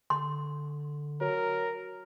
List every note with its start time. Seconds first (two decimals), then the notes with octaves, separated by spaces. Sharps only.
0.10 D3 C6
1.21 F#3 A#4